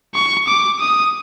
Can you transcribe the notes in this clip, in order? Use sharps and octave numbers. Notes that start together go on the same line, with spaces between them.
C#6
D6
D#6